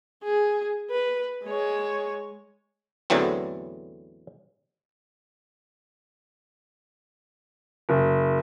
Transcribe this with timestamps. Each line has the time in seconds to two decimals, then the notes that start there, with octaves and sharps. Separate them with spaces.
0.24 G#4
0.90 B4
1.44 G#3 C#5
3.10 E2 A2 D3 E3 F#3 C4
7.89 F#1